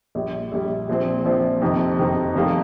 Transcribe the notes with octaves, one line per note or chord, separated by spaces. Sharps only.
A#1 A#2 G3
A#1 A#2 G3
A#1 A#2 F3 C4
A#1 A#2 F3 C4
F2 C3 D#3 C4 D#4
F2 C3 D#3 C4 D#4
F1 F2 D#3 G3 A#3